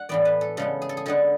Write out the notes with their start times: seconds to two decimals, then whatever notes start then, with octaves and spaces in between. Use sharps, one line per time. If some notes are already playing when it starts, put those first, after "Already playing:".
Already playing: F#5
0.09 A2 E3 B3 D5
0.25 B4
0.41 A4
0.57 C#3 G#3 B3 A4
0.82 G#4
0.89 A4
0.97 G#4
1.06 D3 G#3 B3 A4